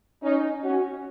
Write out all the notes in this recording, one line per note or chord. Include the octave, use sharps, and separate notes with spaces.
C#4 D#4
C#4 F#4